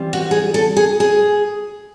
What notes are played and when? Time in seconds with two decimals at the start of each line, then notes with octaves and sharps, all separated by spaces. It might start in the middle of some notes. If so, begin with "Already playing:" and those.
Already playing: E3 G3 C4 F4
0.13 F#4
0.31 G#4
0.54 A4
0.77 G#4
1.00 G#4